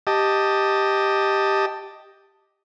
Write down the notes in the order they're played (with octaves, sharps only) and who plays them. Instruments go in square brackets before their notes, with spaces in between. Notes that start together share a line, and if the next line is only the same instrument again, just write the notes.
[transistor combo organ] G4 D#5 A5